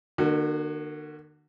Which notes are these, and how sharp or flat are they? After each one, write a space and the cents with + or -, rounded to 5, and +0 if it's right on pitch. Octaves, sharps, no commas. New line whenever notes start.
D3 +45 A#3 +20 F#4 +0